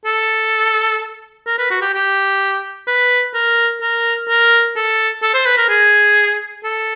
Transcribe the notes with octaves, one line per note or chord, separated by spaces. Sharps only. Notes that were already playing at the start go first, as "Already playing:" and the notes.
A4
A#4
B4
F#4
G4
G4
B4
A#4
A#4
A#4
A4
A4
C5
B4
A#4
G#4
A4